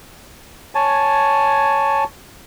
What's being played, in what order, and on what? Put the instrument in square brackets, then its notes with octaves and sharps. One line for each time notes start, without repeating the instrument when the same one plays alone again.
[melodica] C#5 G#5 A5